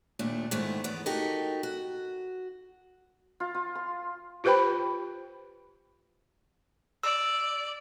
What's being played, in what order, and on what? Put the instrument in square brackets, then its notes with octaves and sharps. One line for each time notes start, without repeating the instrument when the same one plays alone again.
[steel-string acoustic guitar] D#2 A#2 A3 D4
G#2 D#3 A3 B3
E2 B3 D5
D#4 F#4 G4 A4 A#4
F#4
[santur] F4
F4
C6
[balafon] F4 G4 B4 C5 G5 B5
[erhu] D5 [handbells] E6